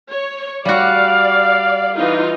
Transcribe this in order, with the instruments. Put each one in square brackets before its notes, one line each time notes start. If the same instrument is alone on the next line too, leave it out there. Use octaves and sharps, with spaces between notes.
[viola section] C#5
[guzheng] G3 F#4 [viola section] D5 [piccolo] F5
[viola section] E3 D#4 F4